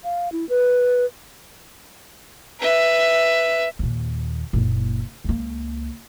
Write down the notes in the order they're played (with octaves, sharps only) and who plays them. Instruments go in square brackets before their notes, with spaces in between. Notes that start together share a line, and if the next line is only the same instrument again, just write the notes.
[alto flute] F5
E4
B4
[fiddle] B4 E5
[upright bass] D#2 A#2
F#1 A#2
C#2 A#3